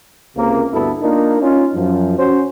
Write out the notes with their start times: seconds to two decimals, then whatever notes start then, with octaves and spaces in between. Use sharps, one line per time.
0.36 C#2 C3 A#3
0.73 D2 G2 B3 E4 F#4 A4
1.02 A#3 D4 D#4 F4 A#4
1.41 C#4 D#4 F4
1.75 F#2 F3
2.18 C#4 F#4 C5